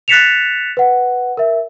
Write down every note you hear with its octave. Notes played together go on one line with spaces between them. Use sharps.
F#6 A6 B6 C#7 E7 F7
B4 F#5
A#4 E5